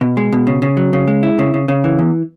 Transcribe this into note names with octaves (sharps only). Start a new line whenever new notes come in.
B2
G#3
B2
C#3
C#3
F#3
C#3
G#3
E4
C#3
C#3
C#3
E3
E2